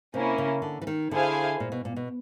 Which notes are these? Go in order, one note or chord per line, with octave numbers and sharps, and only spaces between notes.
C3 A#3 C#4 E4
C#3
D3
E3
D#3
D3 E4 G#4 C5 F5 G#5
A#2
B2
A#2
B2